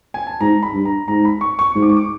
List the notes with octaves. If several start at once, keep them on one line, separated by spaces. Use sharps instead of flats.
G#5
A5
G#2 A#5
B5
G2
A#5
G#2 A#5
B5
C#6
C#6
G#2
D6
C#6
D6